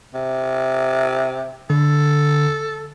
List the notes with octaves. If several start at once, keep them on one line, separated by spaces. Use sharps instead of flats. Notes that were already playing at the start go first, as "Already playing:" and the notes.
C3
D3 A4